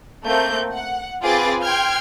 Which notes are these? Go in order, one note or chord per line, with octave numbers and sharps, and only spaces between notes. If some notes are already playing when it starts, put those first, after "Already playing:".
A3 A#3 C4 G6
F#5
C4 F4 G#4 B4 D6 A6
G5 C6 F6 G#6